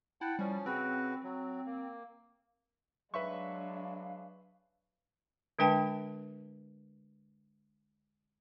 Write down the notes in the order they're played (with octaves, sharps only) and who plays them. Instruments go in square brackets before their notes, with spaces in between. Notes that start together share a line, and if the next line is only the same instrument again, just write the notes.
[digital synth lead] E4 [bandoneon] F#5 G5 A5
[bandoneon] F3 C#4 [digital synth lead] G3
[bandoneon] C#3 F#4 B4 [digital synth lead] C4
[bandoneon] F#3
A#3
[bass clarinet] F#3 [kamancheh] G#3 D4 [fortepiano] B4 E5 C#6 [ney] F5
[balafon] D3 G#3 D4 B4 G5 A5